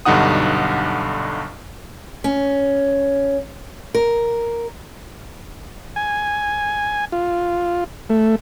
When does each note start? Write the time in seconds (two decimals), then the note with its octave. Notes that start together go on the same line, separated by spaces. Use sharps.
0.05 B1 G2 D3 D#4 F#5 D#6
2.24 C#4
3.95 A#4
5.96 G#5
7.12 F4
8.10 A3